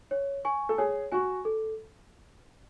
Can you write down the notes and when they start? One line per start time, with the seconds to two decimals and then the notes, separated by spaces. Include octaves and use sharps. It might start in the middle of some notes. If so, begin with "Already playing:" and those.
0.11 C#5
0.45 G#5 C#6
0.69 A4
0.78 G#4 C#5
1.12 F#4 G#5 C#6
1.45 A4